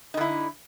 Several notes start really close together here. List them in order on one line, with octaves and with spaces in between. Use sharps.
D#4 D3 E4